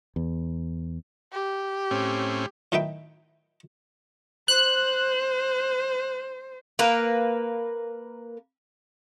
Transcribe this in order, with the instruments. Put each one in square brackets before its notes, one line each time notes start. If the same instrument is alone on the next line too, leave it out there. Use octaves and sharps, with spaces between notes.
[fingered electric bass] E2
[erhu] G4
[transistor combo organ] A2 C4 C#4
[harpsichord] A2 D#3 D#4 B4 E5 G5
[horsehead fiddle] C5 [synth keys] F#6
[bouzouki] A#3 A#4 B4